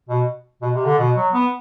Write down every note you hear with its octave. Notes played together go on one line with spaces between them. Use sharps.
B2
B2
C3
D3
B2
F#3
B3